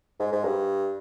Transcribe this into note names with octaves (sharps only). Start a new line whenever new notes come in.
G#2
G#2
G2